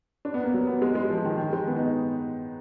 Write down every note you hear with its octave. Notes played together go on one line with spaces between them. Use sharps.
D4
B3
A#3
F#3
B3
G#3
G#3
F3
D#3
D#3
G#3
B3
D#4